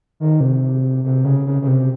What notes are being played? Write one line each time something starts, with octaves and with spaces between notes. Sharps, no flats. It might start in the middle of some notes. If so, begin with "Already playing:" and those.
D#3
C3
C3
C#3
C#3
C#3
C3